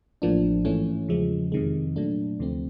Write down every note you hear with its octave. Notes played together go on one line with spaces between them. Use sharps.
A1 A2 F3 A#3 D4
G#2 E3 A3 C#4
E2 C#3 F3 G#3
F2 C3 D#3 G#3
A#2 F#3 A3 D4
D2 C3 F3 A3 C4